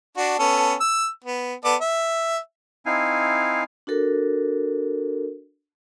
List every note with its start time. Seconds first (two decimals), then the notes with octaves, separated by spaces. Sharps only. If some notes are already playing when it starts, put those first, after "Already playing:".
0.17 D4 F#4
0.39 B3 C#4 A4
0.80 E6
1.24 B3
1.64 B3 A4 D5
1.81 E5
2.86 C4 D#4 E4 F5 G#5
3.87 D4 F#4 A4 A#4